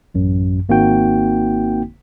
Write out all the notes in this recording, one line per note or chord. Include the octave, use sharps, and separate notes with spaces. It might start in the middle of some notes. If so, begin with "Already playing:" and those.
A1 F#2
G#1 A#3 C4 D#4 F#4 G5